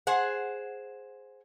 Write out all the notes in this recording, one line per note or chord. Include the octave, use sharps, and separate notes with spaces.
G#4 C5 F#5